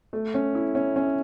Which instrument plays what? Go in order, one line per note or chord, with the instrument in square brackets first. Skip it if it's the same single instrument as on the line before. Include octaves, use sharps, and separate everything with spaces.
[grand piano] A3
C#4
E4
C#4
C#4